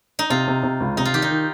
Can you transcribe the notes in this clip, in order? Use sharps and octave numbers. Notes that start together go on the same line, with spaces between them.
D#4
C3 F4
C3
C3
C#2
C3 D#4
F4
D#3 G4
D#4
D#3